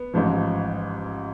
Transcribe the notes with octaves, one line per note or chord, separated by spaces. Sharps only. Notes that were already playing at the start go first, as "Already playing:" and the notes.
Already playing: B3
A1 G#2 F3